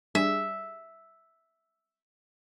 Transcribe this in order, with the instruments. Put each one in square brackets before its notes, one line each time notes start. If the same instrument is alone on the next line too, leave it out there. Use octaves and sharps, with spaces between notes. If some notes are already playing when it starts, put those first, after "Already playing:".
[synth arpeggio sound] G3 D4 G#4 [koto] E5